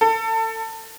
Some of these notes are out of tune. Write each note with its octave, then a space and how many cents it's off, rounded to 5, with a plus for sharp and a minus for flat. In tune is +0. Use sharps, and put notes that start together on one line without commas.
A4 +30